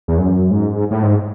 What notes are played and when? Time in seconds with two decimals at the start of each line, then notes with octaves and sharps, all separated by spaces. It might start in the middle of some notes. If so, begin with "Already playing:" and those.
0.08 E2
0.18 F#2
0.51 G#2
0.91 A2
1.03 G#2